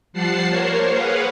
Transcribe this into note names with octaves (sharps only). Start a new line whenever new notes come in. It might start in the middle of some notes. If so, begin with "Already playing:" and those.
F3 G3 F#5 A5 C7
A#3 A#4 C5 C#5
G#4 B4 F5 F#5